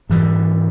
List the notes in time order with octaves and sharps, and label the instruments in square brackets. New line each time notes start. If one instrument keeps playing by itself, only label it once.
[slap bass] G#2 E3 G3